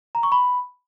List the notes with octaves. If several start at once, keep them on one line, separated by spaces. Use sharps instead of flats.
A#5
C#6
B5